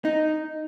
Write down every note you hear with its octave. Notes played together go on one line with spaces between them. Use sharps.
D#4